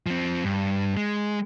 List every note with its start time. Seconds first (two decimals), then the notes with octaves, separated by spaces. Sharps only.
0.06 F3 C4
0.44 G2
0.97 G#3